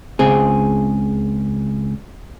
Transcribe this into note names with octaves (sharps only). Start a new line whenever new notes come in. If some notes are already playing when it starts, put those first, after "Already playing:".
C#2 C4 G#4